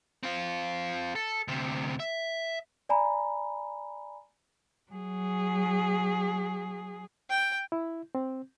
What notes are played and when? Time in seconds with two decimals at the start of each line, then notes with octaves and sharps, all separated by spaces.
0.23 C4 F4
1.15 A4
1.48 D2 C3
2.00 E5
2.89 D5 G#5 A#5 B5
4.91 F#3 G#4
7.30 G5
7.72 E4
8.15 C4